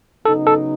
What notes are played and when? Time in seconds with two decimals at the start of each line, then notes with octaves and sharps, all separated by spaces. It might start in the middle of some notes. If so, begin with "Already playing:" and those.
0.25 C#3 F#3 B3 D#4 A4
0.47 A4